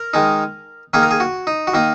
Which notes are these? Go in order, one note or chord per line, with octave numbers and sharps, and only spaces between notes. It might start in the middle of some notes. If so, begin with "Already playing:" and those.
Already playing: A#4
D#3 G#3 D#4
D#3 A#3 D#4 G#4
A#4
G#4
F#4
D#4
F#4
D#3 A#3 D#4